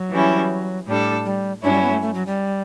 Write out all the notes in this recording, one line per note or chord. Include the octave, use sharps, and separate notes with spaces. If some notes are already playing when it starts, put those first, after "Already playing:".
Already playing: F#3
E3 G3 C#4 E4
A2 G3 D4 A4
G3
G2 F#3 C#4 D4 E4
G3
B3
A3
A3
F#3
G3